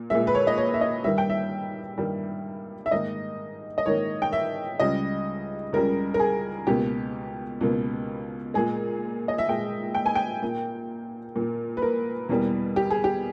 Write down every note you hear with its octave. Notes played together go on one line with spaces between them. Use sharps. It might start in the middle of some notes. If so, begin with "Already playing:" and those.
Already playing: A#2
A#2 G#3 E5
B4
C#5
D#5
C#5
E5
D#5
G2 D#3 G3 E5
G5
E5
G2 D#3 G3
E5
G#2 D#3 A#3 D#5
D#5
G#2 D#3 A#3 C#5
G5
E5
C#2 C#3 G3 D#5
C#2 C#3 G3 A#4
A#4
G#4
C#2 B2 A#3 G4
C#2 B2 A#3
A#2 G#3 G#4
D#5
E5
A#2 G#3 G5
G5
G#5
G5
A#2 A#3
A#2 A#3
B4
A#4
E2 B2 G3 A#3
G4
G#4
G4